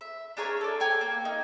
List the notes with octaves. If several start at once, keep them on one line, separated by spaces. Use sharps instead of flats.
E5
D4 G#4 A#4 C#5
A4 D5
C#5 G5 G#5
A#3
D#4